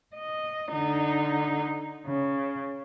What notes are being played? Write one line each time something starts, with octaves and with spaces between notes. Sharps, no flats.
D#5
D3 D#4
C#3